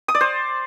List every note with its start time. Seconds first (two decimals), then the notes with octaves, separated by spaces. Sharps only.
0.08 D#6
0.15 D5
0.21 C5